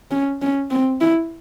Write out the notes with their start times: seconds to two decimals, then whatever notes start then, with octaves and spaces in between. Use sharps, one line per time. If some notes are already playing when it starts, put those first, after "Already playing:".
0.11 C#4
0.42 C#4
0.71 C4
1.01 E4